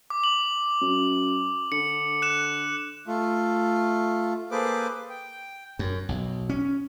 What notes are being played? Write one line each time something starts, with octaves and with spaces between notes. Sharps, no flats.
D6
F#7
F#2
D3 C#7
F#6 E7
A3 F4
A#3 G#4 A4 B4 C5 D6
G5
F#2
B1
C#4